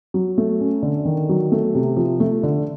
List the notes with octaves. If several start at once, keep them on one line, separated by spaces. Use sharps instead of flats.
F#3
A3
C#4
D3
D#3
F#3
A3
C3
F3
A3
D3